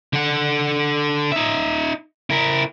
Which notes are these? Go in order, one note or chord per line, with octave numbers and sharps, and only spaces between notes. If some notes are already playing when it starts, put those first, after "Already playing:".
D3 F#5
D#4 E5
E4 A#4